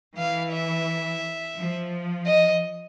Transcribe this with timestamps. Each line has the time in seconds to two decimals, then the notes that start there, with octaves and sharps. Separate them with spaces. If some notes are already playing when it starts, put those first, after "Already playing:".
0.18 E3 F5
0.52 E5
1.57 F3
2.26 D#5